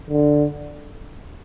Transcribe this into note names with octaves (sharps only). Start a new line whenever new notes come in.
D3